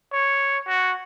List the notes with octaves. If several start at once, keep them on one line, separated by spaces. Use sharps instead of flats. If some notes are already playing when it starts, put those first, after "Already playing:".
C#5
F#4